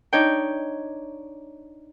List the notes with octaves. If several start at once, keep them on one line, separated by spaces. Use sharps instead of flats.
D4 D#4 C#5 G5